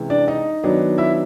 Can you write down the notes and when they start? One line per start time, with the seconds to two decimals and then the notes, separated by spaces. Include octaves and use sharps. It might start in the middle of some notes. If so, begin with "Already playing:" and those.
Already playing: C3 E3 G#3 C#4
0.10 D4 D5
0.28 D#4 D#5
0.63 D#3 F#3 B3 D4
0.98 E4 E5